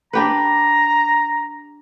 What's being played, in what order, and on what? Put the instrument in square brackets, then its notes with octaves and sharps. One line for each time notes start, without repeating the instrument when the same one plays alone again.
[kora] D4 G4 B4 [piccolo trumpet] A#5